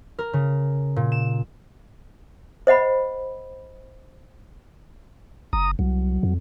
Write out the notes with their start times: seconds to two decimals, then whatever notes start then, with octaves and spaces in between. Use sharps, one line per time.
0.19 A#4
0.33 C#3
0.96 A#2
1.12 E7
2.67 C5 D#5 F#5 B5
5.53 F#1 A#5 D#6
5.79 C2 F#3
6.23 F2